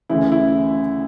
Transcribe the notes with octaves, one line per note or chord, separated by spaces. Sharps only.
D2 C#3 E3 E4
E4